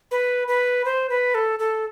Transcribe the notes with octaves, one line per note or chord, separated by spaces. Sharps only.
B4
B4
C5
B4
A4
A4